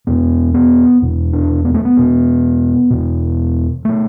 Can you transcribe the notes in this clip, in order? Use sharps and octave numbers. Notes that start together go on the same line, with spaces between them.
E2 B2 B3
B3
E2 B2
D4
B3
A3
B3
E2 B2
E2 B2
B2 A3